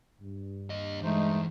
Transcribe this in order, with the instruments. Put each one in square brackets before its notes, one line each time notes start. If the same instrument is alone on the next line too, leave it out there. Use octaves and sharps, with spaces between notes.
[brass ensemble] G2
[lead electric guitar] D#2 D#5
[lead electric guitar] E2 [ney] G#3 [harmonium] A3 D#4 C5